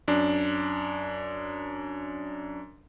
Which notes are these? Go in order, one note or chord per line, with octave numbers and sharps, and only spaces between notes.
F#2 D4